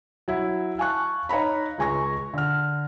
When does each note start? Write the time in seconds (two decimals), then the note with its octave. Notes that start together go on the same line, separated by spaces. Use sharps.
0.28 F#3 E4
0.78 F5 G#5 A5 C#6 F#6
1.29 D#4 C#5 F5 A#5 B5
1.78 C#2 G#3 G#5 C#6 A#6
2.34 D3 F6